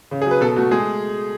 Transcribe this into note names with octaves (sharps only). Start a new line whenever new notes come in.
C#3
G#4
F#3 B4
B2 A4
A3 F#4
G#3 G#4